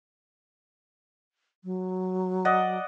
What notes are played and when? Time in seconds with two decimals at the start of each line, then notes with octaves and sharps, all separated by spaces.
1.64 F#3
2.45 D5 D#5 F#5